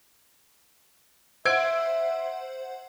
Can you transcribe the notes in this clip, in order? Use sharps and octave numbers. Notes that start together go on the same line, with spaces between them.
C5 E5 F#5 E6 G#6 D7